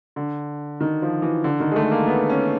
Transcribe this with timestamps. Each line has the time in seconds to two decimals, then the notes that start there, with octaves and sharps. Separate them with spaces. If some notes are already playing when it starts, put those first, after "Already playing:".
0.16 D3
0.81 D#3
1.02 F3
1.22 E3
1.44 D3
1.60 D#3
1.72 G#3
1.76 A3
1.91 A#3
2.07 B3
2.30 C#4